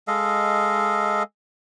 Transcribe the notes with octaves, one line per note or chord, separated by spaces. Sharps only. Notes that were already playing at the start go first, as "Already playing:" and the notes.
G#3 A4 D#5 F5